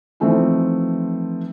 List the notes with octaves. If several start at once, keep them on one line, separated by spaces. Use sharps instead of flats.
E3 F3 A3 C4 D#4 F4